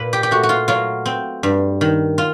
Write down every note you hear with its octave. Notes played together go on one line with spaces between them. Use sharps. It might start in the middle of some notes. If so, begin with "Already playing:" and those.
Already playing: A#2 B4
G4
G4
A3 F#4
F#4
F4
F#3 F4
C4
G2
D#3
F4